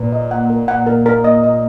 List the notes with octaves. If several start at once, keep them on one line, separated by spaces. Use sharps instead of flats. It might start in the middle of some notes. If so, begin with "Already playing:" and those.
Already playing: A#2 B4
D#5
F#5
A#4
A#2 F#5
A#4
A#4
D#5
D#5